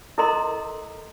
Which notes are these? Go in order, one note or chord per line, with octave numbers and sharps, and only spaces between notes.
E4 A4 A#4 D#5 A#5 C6